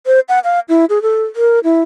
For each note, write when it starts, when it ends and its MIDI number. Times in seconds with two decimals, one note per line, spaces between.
0.06 0.20 72
0.29 0.39 78
0.44 0.60 77
0.69 0.85 64
0.90 1.02 68
1.02 1.24 69
1.36 1.59 70
1.64 1.81 64